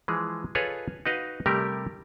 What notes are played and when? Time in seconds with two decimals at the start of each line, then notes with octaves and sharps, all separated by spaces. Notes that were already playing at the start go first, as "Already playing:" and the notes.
0.08 E3 F3 G#3 G#4
0.55 F4 G#4 A4 B4 C#5 D#5
1.06 D#4 F#4 B4 D#5 F5
1.46 C3 G3 A3 G4 A#4